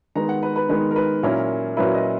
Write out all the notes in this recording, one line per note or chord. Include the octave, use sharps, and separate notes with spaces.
D#3 G#3 B3 A#5
F#5
B4
B4
D#3 G#3 B3 B4
A#4
B4
A#2 F#3 C#4 E4 A#4
A#2 F#3 C#4 E4 B4
D#5